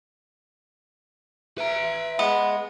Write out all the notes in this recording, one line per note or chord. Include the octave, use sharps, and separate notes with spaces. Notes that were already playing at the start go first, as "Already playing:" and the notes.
B4 E5 A#5
G#3 B3